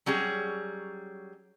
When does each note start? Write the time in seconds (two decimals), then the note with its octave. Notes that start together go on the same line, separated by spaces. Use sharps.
0.06 F#3 G3 C#4 G#4